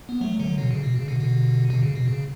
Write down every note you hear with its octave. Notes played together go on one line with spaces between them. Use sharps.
B3
F#3 A3
D3 F#3
B2 D3
C#3
B2
C#3
B2 D3
B2 D3
B2 D3
C#3
B2
C#3